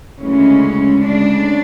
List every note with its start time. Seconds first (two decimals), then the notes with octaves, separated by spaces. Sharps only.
0.18 D2 C#3 E3 G#3 C#4
1.02 D2 C#3 G#3 D4